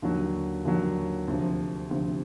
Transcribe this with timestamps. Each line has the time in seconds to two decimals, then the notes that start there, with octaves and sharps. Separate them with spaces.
0.02 D#2 D3 F#3
0.65 D#2 D3 F#3
1.28 D2 C3 F3
1.90 D2 C3 F3